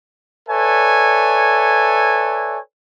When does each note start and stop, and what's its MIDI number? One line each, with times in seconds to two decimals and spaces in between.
0.49 2.59 69
0.49 2.59 71
0.49 2.59 73
0.49 2.59 74
0.49 2.59 76
0.49 2.59 80